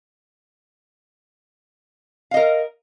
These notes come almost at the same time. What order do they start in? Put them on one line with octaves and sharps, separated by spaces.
F5 D#5 A#4